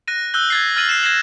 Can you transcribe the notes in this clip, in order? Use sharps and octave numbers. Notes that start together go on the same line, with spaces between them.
F#6 A#6 D#7
E6 F#6 G6 G7
G#6 A6 C7
F6 A6 D#7 F#7
C7 E7
G#6 A#6 C7 E7 F#7